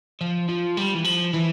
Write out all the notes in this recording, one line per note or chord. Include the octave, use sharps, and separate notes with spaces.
F3
F3
G3
E3
F3
E3